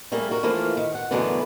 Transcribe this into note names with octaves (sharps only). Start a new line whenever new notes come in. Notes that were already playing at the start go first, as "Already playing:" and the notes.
G3 A3 A#3 G#4
F#4 A#4
E3 F3 A3 A#3 F4
D#3
F#5
F#2 B2 D3 E3 A3 B3